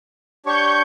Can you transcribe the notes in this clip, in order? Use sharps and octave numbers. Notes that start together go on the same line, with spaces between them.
D4 G4 C#5 C#6 G6